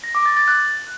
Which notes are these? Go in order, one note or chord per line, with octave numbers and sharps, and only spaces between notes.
A#6
D6
A6
A6
F#6